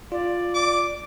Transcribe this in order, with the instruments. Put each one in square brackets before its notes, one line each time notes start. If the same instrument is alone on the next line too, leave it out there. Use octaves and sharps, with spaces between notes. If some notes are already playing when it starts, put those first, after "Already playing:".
[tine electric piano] F4 [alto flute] D5
[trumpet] D6